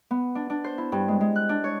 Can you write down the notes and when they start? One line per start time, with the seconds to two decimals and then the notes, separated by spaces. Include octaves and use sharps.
0.11 B3
0.35 D4
0.50 D4
0.64 C5
0.78 E4
0.92 G2
1.08 G#3
1.21 G#3
1.36 F#6
1.49 D4
1.64 C#5